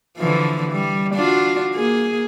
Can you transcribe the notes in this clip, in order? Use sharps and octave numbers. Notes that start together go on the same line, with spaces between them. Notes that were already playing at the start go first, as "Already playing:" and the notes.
D3 E3 F3
G3
D4 F4 F#4
A#3 G#4